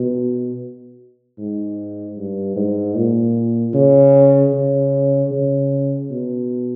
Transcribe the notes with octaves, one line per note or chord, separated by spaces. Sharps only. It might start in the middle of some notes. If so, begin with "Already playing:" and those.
Already playing: B2
G#2
G2
G#2
A#2
C#3
C#3
C#3
B2